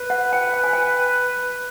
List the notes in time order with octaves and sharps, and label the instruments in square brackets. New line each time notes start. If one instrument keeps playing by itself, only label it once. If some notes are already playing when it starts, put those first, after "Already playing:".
Already playing: [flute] B4
[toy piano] F#5
G5
G5
G#5
G5